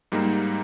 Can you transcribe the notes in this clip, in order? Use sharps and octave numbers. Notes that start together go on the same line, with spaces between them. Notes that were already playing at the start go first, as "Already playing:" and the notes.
G#2 G3 A#3 D#4